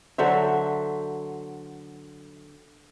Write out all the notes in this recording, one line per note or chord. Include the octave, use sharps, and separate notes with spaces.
D3 F#3 C5 E5